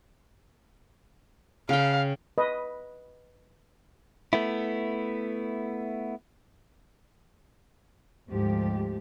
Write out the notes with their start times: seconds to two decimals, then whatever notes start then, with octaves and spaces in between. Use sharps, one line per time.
1.69 C#3 F5 G5
2.38 B4 D#5
4.33 A3 B3 E4
8.28 D2 G#2 F3 G4